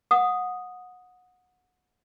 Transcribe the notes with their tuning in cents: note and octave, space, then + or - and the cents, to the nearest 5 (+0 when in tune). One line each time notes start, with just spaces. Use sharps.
F#5 -20 D#6 +0